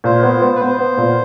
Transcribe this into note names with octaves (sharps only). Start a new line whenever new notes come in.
A#2 C5
B3
B3
B4
B3 C5
B3
A#2